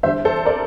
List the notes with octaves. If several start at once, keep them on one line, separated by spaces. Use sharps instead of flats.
E2 D3 G3 C5 E5
A4 C5
A#4 D5